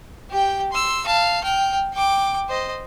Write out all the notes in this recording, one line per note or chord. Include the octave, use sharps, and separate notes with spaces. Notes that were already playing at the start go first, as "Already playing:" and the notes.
G4 G5
C6 E6
F5 A5
G5 F6
G5 D6
C5 D#5